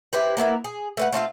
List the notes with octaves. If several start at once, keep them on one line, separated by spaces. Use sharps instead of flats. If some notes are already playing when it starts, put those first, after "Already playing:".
E4 G4 B4 C5
A#3 B3 E4 A#4
G#4
A3 B4 F#5
A3 C4 F4 F5